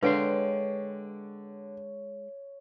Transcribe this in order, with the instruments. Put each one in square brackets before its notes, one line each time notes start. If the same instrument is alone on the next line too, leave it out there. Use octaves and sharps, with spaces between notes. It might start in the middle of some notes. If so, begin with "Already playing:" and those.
[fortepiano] D3 [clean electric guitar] G#3 G5 C6 [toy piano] B4 F5 [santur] C#5